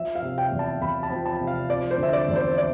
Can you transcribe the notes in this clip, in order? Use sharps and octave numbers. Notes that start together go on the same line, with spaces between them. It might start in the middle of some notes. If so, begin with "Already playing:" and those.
Already playing: F3 E5
F5
C3
G5
E2
A5
E2 B5
A5
F3
A5
C3
F5
F3 D5
C5
D3 E5
D5
E2
C5
D5